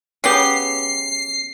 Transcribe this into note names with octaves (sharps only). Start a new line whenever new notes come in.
C#3 B3 G4 C7